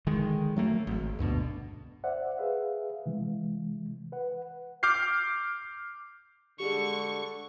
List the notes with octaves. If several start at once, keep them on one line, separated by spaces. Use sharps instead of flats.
D3 D#3 G#3
F#3 A3 A#3
G#1
D2 G2 B2 D3
C5 D5 E5 F#5
G#4 B4 E5 F5
C3 E3 G#3
B4 F#5
D6 F6 G6 C7
D3 G3 G#3 C#6